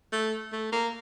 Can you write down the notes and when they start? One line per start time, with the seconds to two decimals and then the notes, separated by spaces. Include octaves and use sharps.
0.12 A3
0.52 A3
0.72 A#3